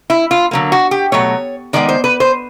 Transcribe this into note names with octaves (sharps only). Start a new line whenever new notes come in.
E4
F4
D3 F#3 A#3
F#4
G4
B2 F#3 A3 C#5
D#3 G#3 B3 D5
C5
B4
C5